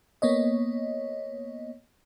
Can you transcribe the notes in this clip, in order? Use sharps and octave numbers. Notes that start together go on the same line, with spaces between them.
A#3 B3 C#5 D#5